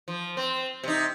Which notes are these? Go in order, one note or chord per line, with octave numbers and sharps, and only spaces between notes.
F3
C4
C3 D#4